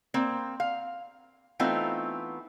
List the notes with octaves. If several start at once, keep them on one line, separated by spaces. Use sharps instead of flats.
A#3 C4
F5
E3 A3 B3 C4 D#4 F4